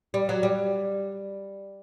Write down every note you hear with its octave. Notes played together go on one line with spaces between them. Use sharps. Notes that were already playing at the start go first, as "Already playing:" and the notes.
G3
F#3
G3